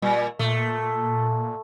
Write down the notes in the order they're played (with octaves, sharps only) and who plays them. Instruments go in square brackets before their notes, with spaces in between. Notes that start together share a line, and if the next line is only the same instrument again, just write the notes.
[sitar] A#2 [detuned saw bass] G3
[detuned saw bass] A#2 [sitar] A3